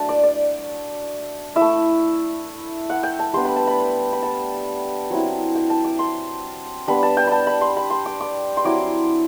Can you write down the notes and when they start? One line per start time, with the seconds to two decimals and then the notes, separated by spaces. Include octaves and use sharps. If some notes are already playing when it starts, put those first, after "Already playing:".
Already playing: F#3 A3 D4 A5
0.09 D5
0.23 D5
1.56 E4 E5
1.61 A3
2.90 F#5
3.03 G5
3.19 A5
3.33 G3 B3 D4 C6
3.45 B5
3.56 A5
3.67 B5
4.13 B5
4.23 A5
5.10 F#3 C4 E4
5.55 G5
5.70 A5
5.84 D6
5.99 C6
6.88 G3 B3 D4 B5
7.03 A5
7.17 G5
7.27 A5 B5
7.47 B5
7.61 C6
7.77 B5
7.90 C6
8.06 D6
8.20 D6
8.57 C6
8.65 F#3 C4 E4 D6